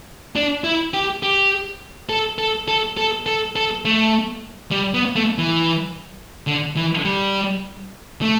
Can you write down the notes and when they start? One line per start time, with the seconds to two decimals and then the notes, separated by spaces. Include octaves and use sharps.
0.36 D4
0.64 E4
0.94 G4
1.23 G4
2.09 A4
2.38 A4
2.68 A4
2.97 A4
3.26 A4
3.56 A4
3.85 A3
4.71 G3
4.94 B3
5.16 A3
5.38 E3
6.47 D3
6.76 E3
7.05 G3
8.22 A3